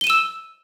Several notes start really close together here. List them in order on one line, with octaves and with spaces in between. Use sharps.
G7 D#7 E7 E6